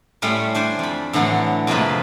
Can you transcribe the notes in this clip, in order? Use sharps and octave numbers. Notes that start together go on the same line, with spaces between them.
A2 G3 A3 C#4 B5 C6
D4 C5 D5 G#5
F2 B5
A2 D3 E3 F#3 D4 E4
F2 C3 F3 G#3 A#3 B4